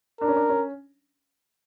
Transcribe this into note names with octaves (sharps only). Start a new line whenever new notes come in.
D4 A#4
C#4
D4
C#4